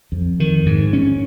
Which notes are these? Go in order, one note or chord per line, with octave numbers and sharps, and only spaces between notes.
F2
D#3
G#2
C#4